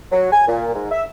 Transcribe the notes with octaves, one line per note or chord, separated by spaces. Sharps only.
F#3
G#5
A#2
G#2
E5